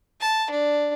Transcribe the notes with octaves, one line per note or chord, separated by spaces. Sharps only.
A5
D4